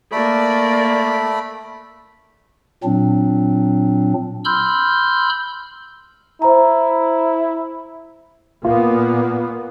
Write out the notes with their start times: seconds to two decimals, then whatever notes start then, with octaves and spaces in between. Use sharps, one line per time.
0.12 A3 A#3 D5 B5
2.84 A#2 F#3 C4 D4
4.45 B5 C6 E6 F6 G6
6.42 E4 C5 A#5
8.65 A#2 A#3 B3 F4